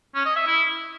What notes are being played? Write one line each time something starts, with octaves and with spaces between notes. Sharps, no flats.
C#4
D#5
E5
E4